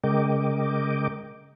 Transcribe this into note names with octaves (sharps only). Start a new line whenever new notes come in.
C#3 G#3 A#4 D#5 G5 D6